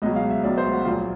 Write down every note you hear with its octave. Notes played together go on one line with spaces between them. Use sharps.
C#2 B2 F#3 D#5
F5
E5
C#2 B2 F#3 D5
C5
F#4
A#1 A#2 F#3 F4